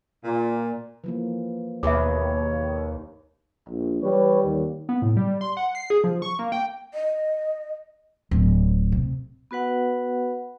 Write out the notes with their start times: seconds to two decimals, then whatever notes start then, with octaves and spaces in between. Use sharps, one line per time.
0.24 A#2
1.04 E3 F3 A#3
1.83 D#2 B2 G#4 B4 C#5 E5 D6
3.69 A#1
4.03 E3 G3 B4 C#5
4.43 D#2
4.89 B3
5.02 A2
5.17 G3
5.41 C6
5.57 F#5
5.75 C7
5.90 G#4
6.04 F3
6.22 C#6
6.39 A#3
6.52 G5
6.94 D#5
8.31 D1
8.92 C3
9.51 B3 F#4 B4 F#5